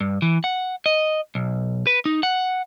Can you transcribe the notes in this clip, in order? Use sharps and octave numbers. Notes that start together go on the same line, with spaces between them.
G2
E3
F#5
D#5
B1
B4
D#4
F#5